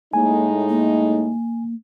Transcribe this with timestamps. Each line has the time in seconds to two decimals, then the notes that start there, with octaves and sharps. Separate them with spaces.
0.13 A2 G#3 A#3 D#4 G#5
0.69 A#3